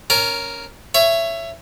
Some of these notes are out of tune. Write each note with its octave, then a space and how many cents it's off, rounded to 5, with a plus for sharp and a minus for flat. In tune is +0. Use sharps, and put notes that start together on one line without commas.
C#4 +0 A#4 +0 G#5 +40
C#5 +0 E5 +20